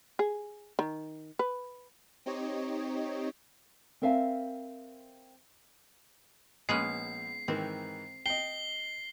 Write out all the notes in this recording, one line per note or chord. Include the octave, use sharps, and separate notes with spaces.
G#4
D#3
B4
C4 D#4 G4 C#5 D#5
C4 A#4 E5 F5 G#5
A#1 G#3 B3 C#4 C7
G#2 D#3 E3 C4
D#5 G5 C7 G7